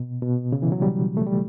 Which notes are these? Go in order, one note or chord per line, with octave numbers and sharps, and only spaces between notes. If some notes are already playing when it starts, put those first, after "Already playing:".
Already playing: B2
B2
C#3
E3
F#3
G3
A3
G3